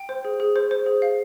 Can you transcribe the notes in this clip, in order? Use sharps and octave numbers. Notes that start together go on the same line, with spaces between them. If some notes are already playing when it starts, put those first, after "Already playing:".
Already playing: G5
C5
G#4
G#4
C5
C5
G#4
F5